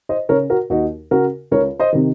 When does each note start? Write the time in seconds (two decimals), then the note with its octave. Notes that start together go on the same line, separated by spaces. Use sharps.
0.09 C5 D#5
0.29 C#3 A#4 C#5
0.50 F#4 A#4
0.70 D#2 D#4 F#4
1.11 C#3 F#4 A#4
1.51 C#2 A#4 C#5
1.79 C5 D#5
1.92 C3 D#3